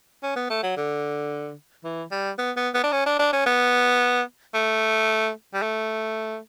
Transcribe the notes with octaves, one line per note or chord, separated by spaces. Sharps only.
C#4
B3
A3
F#3
D3
E3
G3
B3
B3
B3
D4
C#4
D4
D4
C#4
B3
A3
G3
A3